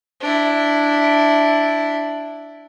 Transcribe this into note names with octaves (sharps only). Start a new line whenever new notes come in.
D4 E4